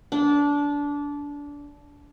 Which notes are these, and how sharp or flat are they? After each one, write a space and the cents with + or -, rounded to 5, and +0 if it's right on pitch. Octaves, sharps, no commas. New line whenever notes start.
D4 -20